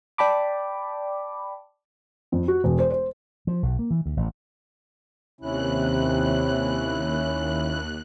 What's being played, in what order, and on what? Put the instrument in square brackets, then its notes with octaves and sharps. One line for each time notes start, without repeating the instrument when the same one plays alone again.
[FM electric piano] D5 G5 A5 B5 D6
[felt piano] F2
F#4
E1
C5
C5
[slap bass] F3
B1
A#3
E3
D2
A1
[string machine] D#2 F#6 [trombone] C3 [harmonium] C#4 E4